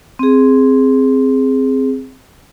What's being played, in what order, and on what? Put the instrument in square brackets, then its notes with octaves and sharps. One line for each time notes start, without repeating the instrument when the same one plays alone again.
[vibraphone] C4 G#4